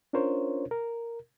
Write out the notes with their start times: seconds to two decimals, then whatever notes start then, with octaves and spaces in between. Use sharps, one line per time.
0.13 C#4 D4 F4 A#4 C5 C#5
0.71 A#4